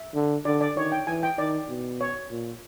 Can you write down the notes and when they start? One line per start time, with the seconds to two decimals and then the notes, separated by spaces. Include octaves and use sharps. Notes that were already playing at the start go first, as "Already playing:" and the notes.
Already playing: E5
0.15 D3
0.45 D3 D5
0.61 D5
0.76 D#3 C#5
0.92 G5
1.07 E3 G#5
1.23 G5
1.38 D#3 D5
1.69 B2
2.01 C#5
2.30 A#2